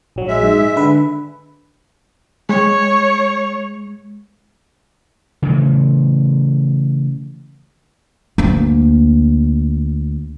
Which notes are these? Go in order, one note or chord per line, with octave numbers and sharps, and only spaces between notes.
A#1 F#3
G#3 E5
G#2
D3 B4
G#3 C#5
C#3 E3 A3
D2 A#3